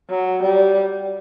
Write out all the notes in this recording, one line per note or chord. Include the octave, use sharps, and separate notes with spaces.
F#3
G3